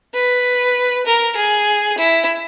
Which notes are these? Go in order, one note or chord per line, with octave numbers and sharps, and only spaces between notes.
B4
A#4
G#4
E4